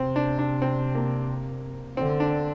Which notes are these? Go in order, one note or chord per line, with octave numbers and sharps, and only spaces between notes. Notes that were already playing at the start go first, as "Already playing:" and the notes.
Already playing: C3 C4
D4
D4
C4
A#3
D3 C4
D4